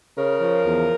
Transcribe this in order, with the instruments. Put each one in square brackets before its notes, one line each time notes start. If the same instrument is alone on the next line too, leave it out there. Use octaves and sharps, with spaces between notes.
[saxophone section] C#3 A#4
F3
E2